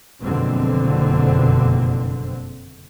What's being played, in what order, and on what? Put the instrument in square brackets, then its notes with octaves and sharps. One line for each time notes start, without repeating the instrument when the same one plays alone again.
[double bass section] F#1 F2 B2 D3 C4